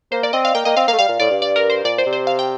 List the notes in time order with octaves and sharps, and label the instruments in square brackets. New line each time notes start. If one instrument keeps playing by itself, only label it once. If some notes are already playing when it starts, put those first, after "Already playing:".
[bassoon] A#3 [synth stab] C5
[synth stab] D5
[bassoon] C4 [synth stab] D#5
[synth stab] F5
[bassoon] A#3 [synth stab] G5
[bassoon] A#3 [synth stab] D#5
[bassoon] C4 [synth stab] F5
[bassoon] A#3 [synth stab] F5
[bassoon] A3
[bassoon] G3 [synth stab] F5
[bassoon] A#2
[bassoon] A2 [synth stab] D5
[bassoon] G2
[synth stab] D5
A#4
C5
[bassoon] A#2 [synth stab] D5
[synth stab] C5
[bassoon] C3
[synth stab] C5
F5
G5